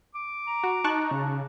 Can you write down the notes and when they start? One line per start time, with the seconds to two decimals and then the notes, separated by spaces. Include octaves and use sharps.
0.15 D6
0.47 A#5
0.63 F#4
0.84 D#4 A5 C#6 F#6
1.11 C#3